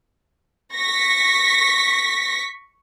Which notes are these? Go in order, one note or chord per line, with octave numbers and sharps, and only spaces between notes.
C#6 A#6 B6